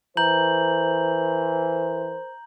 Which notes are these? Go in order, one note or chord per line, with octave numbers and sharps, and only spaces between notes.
E3 A#4 C5 A#5 G6 F#7